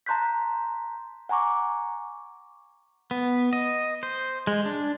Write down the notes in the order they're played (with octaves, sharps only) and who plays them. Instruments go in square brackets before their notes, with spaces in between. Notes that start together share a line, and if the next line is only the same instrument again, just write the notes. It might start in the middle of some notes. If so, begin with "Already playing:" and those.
[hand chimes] A5 A#5 C6 F#6 G6 B6
F#5 G#5 A#5 C#6 D6
[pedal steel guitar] B3
D#5
C5
G#3
D4